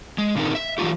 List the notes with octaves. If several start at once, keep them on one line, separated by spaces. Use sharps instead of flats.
G#3
A#2 D3 D#3 C4 D#4 A#4
E5
E3 F#3 G#3 A3 F4 G4